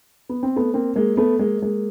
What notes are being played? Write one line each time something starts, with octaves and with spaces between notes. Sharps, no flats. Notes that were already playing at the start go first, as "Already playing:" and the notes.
B3
C4
A3 B3
A#3 C4
G#3 A#3
A3 B3
G#3 A#3
G#3 A#3